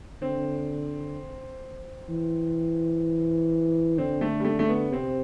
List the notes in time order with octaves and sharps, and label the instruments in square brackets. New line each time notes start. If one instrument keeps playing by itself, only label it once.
[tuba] D3 [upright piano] C4
[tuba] E3
[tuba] D3 [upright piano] C4
[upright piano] A3
G3
A3
A3
B3
[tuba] C3 [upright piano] C4